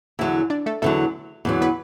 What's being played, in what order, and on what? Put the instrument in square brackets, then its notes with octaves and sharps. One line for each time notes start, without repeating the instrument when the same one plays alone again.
[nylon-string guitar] E2 D3 F#3 [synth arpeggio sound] E4
[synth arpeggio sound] D4 D5
A3 A4
[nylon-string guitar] E2 D3 F#3 [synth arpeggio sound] A3 A4
[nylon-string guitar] E2 D3 F#3
[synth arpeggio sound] B3 B4